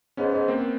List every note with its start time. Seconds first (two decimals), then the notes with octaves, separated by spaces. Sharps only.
0.17 G#2 B3 C#4
0.33 G#2
0.48 A#3 C4